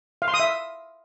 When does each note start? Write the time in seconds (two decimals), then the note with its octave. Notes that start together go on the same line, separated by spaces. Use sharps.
0.22 F5
0.28 C6
0.34 D#6
0.40 E5